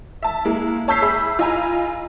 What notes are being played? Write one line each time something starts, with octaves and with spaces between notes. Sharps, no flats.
E5 A5
G#3 A#3 E4
C#5 A5 E6 G6 B6 C7
G#4 E5 B5
F4 D#5 G#5 A#5 B5